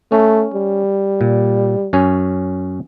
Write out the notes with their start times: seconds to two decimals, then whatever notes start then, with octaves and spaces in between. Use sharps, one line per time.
0.12 A3 C#4
0.54 G3
1.21 A#2
1.93 F#2 C#4 G#5